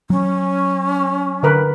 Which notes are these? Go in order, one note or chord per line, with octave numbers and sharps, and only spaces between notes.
F#3 C#4
D3 A#4 B4